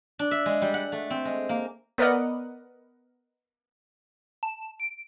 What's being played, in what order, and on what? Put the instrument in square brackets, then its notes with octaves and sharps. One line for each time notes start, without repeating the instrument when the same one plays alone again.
[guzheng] D4
E5
G#3
G3
F#5
A3
C4
G#3
A#3
[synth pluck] B3 A#4 B4 D5 D#5 F#5
[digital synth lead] A5
D7